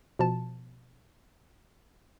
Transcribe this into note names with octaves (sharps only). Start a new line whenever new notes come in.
B2 F3 A5